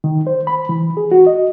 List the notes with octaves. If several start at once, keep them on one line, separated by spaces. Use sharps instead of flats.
D#3
C5
B5
E3
G#4
F#4
D#5